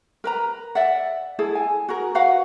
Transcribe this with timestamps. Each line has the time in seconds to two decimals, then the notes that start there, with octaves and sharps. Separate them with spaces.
0.24 A#4 B4 A#5
0.75 D5 E5 F#5
1.39 E4 G#4 A4
1.55 G#5
1.89 F#4 G#4 A#4
2.15 F#4 B4 F5 F#5